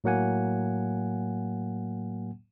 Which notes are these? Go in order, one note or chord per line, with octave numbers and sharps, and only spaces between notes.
A2 F#3 A#3 F#5 G#5